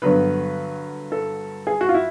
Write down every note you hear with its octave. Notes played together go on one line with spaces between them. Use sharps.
G2 D3 F#3 B3 B4
A4
G#4
F#4
F4
E4